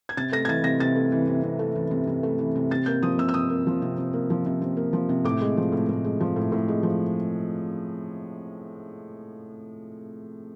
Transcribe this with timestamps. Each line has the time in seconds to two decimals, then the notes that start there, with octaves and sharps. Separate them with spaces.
0.09 G#6
0.17 C3 A6
0.32 A3 A#6
0.45 G#6
0.48 E3 A6
0.64 C3 A#6
0.80 C3 A6
0.96 A3
1.12 E3
1.27 C3
1.43 C3
1.59 A3
1.75 E3
1.91 C3
2.07 C3
2.23 A3
2.39 E3
2.56 C3
2.71 C3 A6
2.86 A#3 G6
3.03 F3 D#6
3.18 C3 E6
3.29 E6
3.34 C3 D#6
3.50 A#3
3.67 F3
3.82 C3
3.98 C3
4.13 A#3
4.30 F3
4.46 C3
4.62 C3
4.77 A#3
4.93 F3
5.09 C3
5.24 A2 D6
5.41 G#3
5.57 F3
5.72 A2
5.89 A2
6.04 G#3
6.20 F3
6.36 A2
6.52 A2
6.68 G#3
6.83 F3